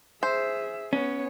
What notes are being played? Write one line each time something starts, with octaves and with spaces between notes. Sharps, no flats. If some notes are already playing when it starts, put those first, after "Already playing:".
G#4 C5 E5
B3 C#4 C#5